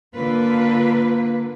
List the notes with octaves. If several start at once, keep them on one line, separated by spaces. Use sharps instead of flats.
D3 A#3 F4 B4